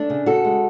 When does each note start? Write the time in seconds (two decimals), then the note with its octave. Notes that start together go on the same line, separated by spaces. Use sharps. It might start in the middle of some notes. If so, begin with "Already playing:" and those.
Already playing: A3 D4
0.10 C#3
0.26 C#3 F#4 A4
0.45 G#3